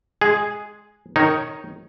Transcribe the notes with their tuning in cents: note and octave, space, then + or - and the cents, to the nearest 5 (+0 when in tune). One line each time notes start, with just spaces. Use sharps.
G#3 +10 G#4 +0
D#3 -10 D#4 +0 C#5 +0